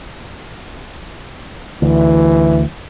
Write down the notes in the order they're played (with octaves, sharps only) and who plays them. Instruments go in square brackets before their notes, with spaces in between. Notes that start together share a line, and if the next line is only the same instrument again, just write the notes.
[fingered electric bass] D2 [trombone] E3